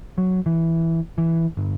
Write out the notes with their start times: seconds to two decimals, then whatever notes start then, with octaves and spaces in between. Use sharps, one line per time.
0.18 F#3
0.46 E3
1.18 E3
1.57 G1